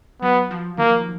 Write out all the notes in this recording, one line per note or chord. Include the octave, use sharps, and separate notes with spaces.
F#3 B3
F3
D#3 A#3